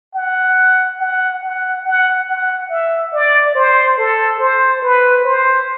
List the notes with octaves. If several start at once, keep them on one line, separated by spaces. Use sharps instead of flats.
F#5
F#5
F#5
F#5
F#5
E5
D5
C5
A4
C5
B4
C5